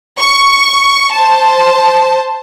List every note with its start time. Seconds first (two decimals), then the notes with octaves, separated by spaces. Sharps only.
0.19 C#6
1.13 C5 A5